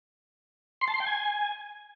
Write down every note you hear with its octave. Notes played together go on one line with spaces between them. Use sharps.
C6
A5
C6
G5
G#5